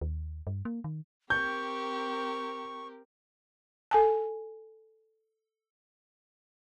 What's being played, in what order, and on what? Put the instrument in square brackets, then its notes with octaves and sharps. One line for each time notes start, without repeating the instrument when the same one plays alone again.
[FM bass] D#2
G2
A#3
D#3
[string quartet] C4 G4 A#4 [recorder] C#6 [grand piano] G6
[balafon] A4 G#5 A5